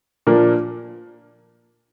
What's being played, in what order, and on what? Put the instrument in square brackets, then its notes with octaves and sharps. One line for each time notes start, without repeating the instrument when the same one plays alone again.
[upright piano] A#2 F3 A#3 D4 A#4